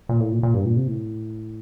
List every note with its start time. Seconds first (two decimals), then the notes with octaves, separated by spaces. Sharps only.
0.09 A#2
0.20 A2
0.31 A#2
0.43 A#2
0.54 G2
0.65 A#2
0.76 C3
0.87 A2